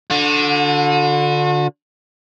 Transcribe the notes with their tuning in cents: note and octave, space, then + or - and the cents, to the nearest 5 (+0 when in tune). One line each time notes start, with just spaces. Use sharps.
D3 +0 F#4 -40